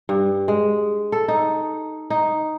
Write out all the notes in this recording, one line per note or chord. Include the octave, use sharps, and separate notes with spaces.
G2
G#3
A4
D#4
D#4